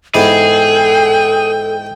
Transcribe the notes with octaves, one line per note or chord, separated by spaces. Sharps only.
G#2 E3 B3 G#4 A4 G5